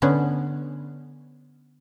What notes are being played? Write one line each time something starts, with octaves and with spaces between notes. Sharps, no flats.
D3 B3 C#4